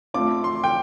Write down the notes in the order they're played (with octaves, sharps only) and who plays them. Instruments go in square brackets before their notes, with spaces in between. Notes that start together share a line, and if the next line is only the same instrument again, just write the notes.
[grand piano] A3 C4 F4 C5 F5 [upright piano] D6
[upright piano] C6
G5